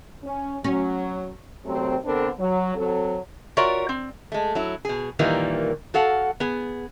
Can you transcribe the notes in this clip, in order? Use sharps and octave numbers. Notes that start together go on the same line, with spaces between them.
C#4
F#3 C#4
D#2 C3 F#3 A3 C4
D3 B3 C4 D4 A4 A#4
F#3
F#3 C4 A4
F4 F#4 A#4 C#5 D5 E5
C4
G#3 A3
F#3 E4
B2 G#4
A#2 D#3 E3 G3 A#3
F#4 A4 F5 F#5
B3 G#4